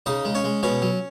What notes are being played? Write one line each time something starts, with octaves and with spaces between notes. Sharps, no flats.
C#3 D#4 D#5
G#3
C#4 C#5
G#3
B2 C#4 C#5
F#3